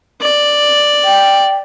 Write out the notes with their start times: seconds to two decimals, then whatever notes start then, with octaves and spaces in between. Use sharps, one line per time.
0.22 D5
1.05 G5